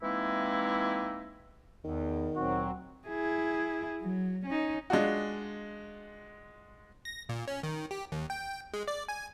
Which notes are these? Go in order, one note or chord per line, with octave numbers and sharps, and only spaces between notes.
E3 G#3 A#3 C4 D#4 E4
E2 D#3
D2 A#2 F#3 C4 F#4
E4 G#4
F#3
C#4 D#4
G#3 D4 F4 F#4
A#6
A#2
C#4
D#3
G4
D#2
G5
G#3
D5
G#5